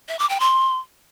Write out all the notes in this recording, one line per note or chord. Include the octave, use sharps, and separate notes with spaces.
E5
D6
G5
C6